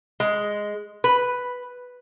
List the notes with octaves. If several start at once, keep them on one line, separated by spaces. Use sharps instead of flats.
G#3
B4